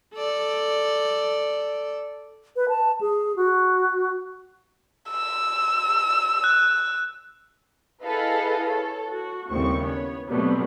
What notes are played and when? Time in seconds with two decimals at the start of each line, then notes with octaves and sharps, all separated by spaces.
0.15 A4 D5
2.56 B4
2.69 A5
3.01 G#4
3.36 F#4
5.10 E6
6.44 F#6
8.03 E4 G#4 A4 B4 D#5 F5
8.68 A4 C#5
9.10 F#4
9.51 D#2 A2 C#3 G3 C4 C#6
9.81 B3 C#5
10.29 B2 F#3 G3 A3 B3 C4